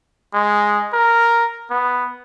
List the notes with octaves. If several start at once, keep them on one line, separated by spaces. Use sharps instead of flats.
G#3
A#4
B3